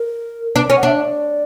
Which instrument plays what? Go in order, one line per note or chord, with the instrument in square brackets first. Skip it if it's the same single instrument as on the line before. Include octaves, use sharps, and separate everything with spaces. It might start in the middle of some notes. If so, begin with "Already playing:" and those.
Already playing: [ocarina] A#4
[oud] D4 [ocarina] B4
[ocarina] D5
[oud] C#4
[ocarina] F#5
[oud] D4 [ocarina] E5
[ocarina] D5